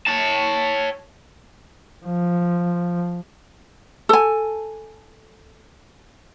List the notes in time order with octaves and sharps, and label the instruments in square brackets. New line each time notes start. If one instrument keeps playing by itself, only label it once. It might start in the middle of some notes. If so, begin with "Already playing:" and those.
[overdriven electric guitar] C#5 A5
[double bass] F3
[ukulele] A4 G#5